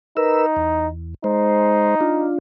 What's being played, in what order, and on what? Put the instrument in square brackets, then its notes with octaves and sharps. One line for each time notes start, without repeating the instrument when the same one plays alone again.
[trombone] D#4 [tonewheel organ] A#4 B4 E6
[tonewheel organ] E2
[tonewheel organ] G#3 C5 [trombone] D#4
[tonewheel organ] D4 F4